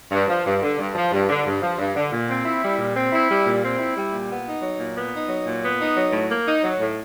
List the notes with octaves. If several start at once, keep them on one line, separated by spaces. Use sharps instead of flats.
G2
F3
G2
D3
G2
F3
G2
D3
G2
F3
G2
D3
A#2
C4
E4
G3
A#2
C4
E4
G3
A#2
C4
E4
G3
A#2
B3
D#4
F#3
A#2
B3
D#4
F#3
A#2
B3
D#4
F#3
A2
A#3
D#4
F#3
A2